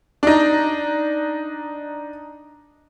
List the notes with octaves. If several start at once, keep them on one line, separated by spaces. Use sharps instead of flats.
D4 D#4